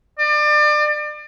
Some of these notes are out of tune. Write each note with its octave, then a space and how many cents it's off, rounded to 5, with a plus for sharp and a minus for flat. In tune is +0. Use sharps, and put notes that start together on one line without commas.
D5 +30